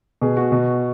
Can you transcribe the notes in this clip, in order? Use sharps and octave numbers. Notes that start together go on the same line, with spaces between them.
B2 G#4
F#4
B2